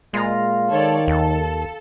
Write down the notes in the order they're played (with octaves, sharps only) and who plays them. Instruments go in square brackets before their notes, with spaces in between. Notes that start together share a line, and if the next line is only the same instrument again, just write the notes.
[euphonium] A#2 [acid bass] G#3 [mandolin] F4 A#5
[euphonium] D#3 [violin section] A4 C#5 D5
[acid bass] D#2 [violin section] A4